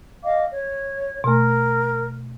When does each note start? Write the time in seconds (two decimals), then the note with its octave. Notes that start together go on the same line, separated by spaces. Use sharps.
0.22 D#5 F5 D6
0.52 C#5
1.24 B2 A3 A#4